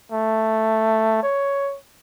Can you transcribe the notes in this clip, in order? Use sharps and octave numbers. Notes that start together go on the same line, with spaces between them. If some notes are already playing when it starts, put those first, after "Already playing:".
A3
C#5